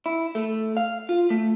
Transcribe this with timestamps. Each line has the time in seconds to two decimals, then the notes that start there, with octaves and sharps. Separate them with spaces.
0.06 E4
0.35 A3
0.77 F5
1.09 F4
1.30 A3